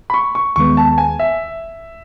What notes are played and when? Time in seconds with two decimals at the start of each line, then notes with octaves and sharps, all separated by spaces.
0.10 B5
0.14 C#6
0.35 C#6
0.56 D#2 D#3 G#3 B3 C#6
0.77 A5
0.98 G#5
1.19 E5